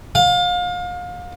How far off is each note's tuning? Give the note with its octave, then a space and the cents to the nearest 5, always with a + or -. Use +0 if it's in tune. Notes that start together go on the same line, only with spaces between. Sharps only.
F5 +30